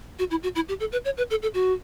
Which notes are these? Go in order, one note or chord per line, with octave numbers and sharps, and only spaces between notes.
F#4
E4
F#4
E4
G4
A4
B4
C#5
B4
A4
A4
F#4